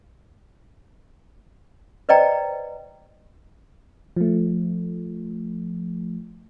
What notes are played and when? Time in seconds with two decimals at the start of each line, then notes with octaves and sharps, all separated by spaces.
2.09 B4 C5 D5 D#5 G5 A#5
4.16 F3 A3